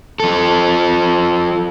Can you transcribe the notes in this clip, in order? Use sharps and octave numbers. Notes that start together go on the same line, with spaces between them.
F3 A4